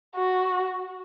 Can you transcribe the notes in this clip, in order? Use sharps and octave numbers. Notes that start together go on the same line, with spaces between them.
F#4